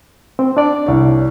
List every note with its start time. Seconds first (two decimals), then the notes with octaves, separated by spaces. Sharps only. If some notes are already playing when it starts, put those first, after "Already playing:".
0.39 C4
0.57 D4 D5
0.86 C2 C#5